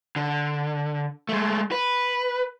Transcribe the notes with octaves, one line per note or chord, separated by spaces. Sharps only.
D3
G#3 A3
B4